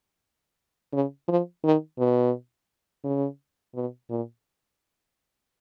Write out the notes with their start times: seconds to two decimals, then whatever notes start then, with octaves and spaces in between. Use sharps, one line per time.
0.93 C#3
1.28 F3
1.64 D#3
1.99 B2
3.04 C#3
3.75 B2
4.10 A#2